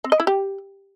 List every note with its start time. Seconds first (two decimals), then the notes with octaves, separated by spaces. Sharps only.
0.04 C4
0.12 D#5
0.20 E4
0.27 G4